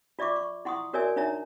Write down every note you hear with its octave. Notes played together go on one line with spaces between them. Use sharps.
F4 D5 E5 C#6 D6
C#6
E4 F#5 C6 C#6 D#6
F#4 A#4 C#5 D5 E5 G#5
D4 D#4 C#5 E5 A#5